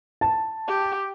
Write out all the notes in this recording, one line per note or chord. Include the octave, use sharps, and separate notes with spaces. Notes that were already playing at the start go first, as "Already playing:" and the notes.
A5
G4